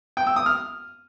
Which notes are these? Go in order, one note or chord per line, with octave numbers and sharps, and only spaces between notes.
G5
E6
D#6
F6